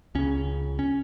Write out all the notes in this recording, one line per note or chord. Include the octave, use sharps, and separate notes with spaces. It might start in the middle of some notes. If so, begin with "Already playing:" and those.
C#2 C#3 C#4
C#4